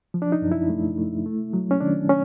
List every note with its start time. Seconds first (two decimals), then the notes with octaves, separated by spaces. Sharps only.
0.14 F3
0.22 D4
0.32 D#4
0.42 F#2
0.52 E4
0.69 A3
0.98 A3
1.26 A3
1.53 F#3
1.71 C#4
1.81 D#3 D4
2.09 C#4